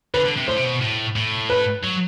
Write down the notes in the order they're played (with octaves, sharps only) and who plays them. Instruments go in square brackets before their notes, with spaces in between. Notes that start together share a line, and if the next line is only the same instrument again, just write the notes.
[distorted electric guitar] D3 [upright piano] B4
[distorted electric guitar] D3
C3
[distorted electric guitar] A2 [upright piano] C5
[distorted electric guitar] C3
B2
A2
A2
[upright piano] B4
[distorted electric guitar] F#3